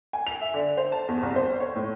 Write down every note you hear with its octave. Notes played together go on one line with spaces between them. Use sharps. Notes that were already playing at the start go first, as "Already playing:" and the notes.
G#5
F7
E5
D3
C5
A5
E2
C2
C5
C#5
A2